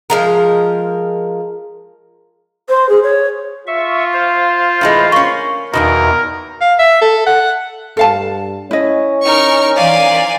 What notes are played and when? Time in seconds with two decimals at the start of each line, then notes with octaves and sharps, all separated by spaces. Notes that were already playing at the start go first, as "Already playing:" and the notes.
0.10 F3 G#3 A#4
2.69 C5
2.89 G#4
3.03 C#5
3.67 F4 E5 C#6
4.13 C5 F5
4.81 A2 E3 G#3
5.12 A#3 C#4 C#6
5.73 E2 B2 D#3 A#3 A#4
6.61 F5
6.79 E5
7.02 A4
7.26 F#5
7.97 G2 A4 F5 A5
8.71 C#4 E4 D#5
9.24 D#4 A#4 C#6 F6
9.75 E3 A#4 C5 D5 F5 G#5